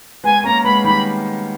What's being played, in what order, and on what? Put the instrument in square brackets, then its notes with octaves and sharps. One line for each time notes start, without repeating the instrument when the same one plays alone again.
[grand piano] G#3 B3 [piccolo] G#5
[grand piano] A#3 C#4 [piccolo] A#5
[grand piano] G#3 B3 [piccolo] B5
[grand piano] D#3 G3 [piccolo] B5